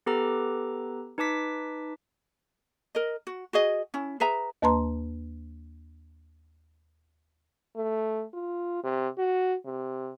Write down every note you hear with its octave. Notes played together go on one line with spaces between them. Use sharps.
B3 G4 A4 B4 A#5 D6
D#4 B4 A5 D6 B6
A#4 D#5
F#4
F#4 G#4 D#5
C#4 E4
G#4 B4 E5 A#5
D#2 A#3 B4 A5 A#5 C6
A3
F4
C3
F#4
C3